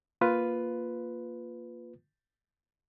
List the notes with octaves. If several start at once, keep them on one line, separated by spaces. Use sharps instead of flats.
A#3 F4 B4